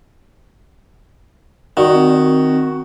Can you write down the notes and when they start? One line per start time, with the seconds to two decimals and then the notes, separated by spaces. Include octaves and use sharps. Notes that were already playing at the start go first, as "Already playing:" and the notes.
1.77 D#3 F#4 D5
1.94 C4